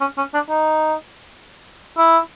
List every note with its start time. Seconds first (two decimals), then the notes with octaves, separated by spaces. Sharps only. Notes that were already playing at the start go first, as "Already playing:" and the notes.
0.01 C#4
0.17 C#4
0.34 D4
0.49 D#4
1.98 E4